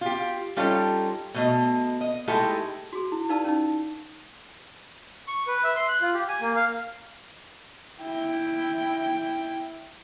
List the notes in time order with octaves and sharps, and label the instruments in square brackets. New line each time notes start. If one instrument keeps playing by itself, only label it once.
[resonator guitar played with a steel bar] F4 G4
G3 C#4 D#4 F4 G4 A4
B2 A3 D#5
D#5
G#3 A3 D#4 E4 G4 A4
[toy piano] F#4 G#4
E4
D#4 B4 D5 F5 A5 E6
C#4 D#4
[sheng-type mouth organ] C#6
B4
E5
C6
F#6
F4
G4
G#5
A#3
F5
[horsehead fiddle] E4 G5